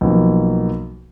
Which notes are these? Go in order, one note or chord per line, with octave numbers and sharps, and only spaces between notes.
B1 F3 A#3